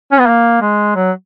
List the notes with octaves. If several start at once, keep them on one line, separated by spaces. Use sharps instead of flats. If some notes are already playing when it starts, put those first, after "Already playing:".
C#4
B3
A#3
G#3
F#3